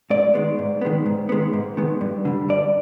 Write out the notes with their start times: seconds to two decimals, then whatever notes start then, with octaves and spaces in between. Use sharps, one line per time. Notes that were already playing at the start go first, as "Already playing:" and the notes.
0.10 G#2 D5
0.34 D#3 G#3 B3
0.59 G#2
0.81 D#3 G#3 B3
1.06 G#2
1.29 D#3 G#3 B3
1.53 G#2
1.77 D#3 G#3 B3
2.01 G2
2.25 D3 G3
2.49 G2 D5